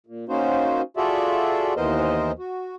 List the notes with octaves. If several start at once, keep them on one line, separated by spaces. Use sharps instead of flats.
A#2
A#3 C#4 D#4 F#4 C5
F4 F#4 G#4 A4 D5 E5
D#2 E3 B3 A#4 C5 D#5
F#4